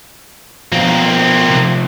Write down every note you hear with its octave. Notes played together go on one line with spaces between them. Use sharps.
B2 F3 A#3 C4
C3 F3